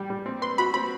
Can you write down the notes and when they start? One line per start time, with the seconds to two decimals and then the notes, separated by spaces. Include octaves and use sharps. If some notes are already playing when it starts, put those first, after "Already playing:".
Already playing: G3 G5
0.10 G3
0.26 C4
0.42 B4 C6
0.58 F#4 B5
0.74 C4 B5